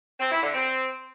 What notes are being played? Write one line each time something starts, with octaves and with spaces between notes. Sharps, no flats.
C4
E4
D3
C4